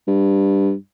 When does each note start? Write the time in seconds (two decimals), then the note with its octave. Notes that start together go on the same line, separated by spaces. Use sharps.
0.07 G2